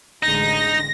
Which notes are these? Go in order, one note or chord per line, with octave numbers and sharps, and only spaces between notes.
A1 D3 G#3 D#4 A#6